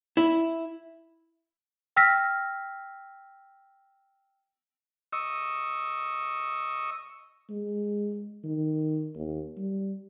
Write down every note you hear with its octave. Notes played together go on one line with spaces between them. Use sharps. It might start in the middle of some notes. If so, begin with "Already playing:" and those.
E4
G5 E6 F6 A#6 B6
D#5 C#6 E6
G#3
D#3
D#2
G3